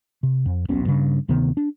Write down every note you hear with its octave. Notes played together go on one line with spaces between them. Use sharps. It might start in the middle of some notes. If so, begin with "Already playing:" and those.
C3
F2
D#1 B1 B2 C#4
G2 C#3
D2 C3 D#3 B3
D4